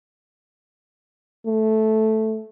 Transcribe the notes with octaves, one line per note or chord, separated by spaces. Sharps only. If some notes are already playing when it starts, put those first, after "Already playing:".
A3